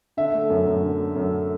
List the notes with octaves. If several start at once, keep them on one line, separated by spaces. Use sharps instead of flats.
D3 E5
A3
F#2
F#2
D3
A3
F#2